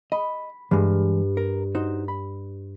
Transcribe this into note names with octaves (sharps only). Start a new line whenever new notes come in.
D#5 B5
G2 E3 G#3
A#4
D#4 F#4 C5
B5